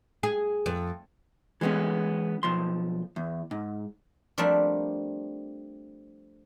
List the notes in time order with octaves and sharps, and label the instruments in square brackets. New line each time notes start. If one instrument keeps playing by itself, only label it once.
[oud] G#4
F2
[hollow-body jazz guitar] E3 G#3 A#3 B3 C#4
B1 F3 C6
E2
G#2
[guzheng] F3 G3 A3 C4 D4 A#4